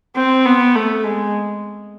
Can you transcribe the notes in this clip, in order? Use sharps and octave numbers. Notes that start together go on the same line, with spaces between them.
C4
B3
A3
G#3